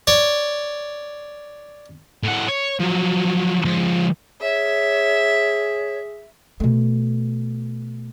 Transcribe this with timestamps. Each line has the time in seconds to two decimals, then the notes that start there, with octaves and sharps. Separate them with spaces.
0.07 C#5 D5
2.24 A2 F#5
2.48 C#5
2.80 F3 F#3
3.65 F3 G#3
4.42 G#4 C#5 E5
6.60 B2 A3